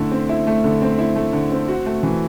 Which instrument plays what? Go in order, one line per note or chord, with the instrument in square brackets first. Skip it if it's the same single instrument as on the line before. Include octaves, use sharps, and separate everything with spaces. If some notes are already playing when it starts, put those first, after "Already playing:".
Already playing: [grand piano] D3 A3 E4
C4
E4
A3
D3
C4
E4
A3
D3
C4
F#4
A3
E3